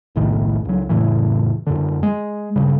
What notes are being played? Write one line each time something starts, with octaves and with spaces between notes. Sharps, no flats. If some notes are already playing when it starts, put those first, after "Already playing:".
F#1 B1 A2 D#3
C#2 F#3
F1 A2 C#3 E3
F#2 D3
G#3
A#1 G2 C#3 G3